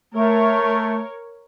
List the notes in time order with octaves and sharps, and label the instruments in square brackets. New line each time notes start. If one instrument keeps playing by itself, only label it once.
[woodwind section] A3 [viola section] A#4 C#5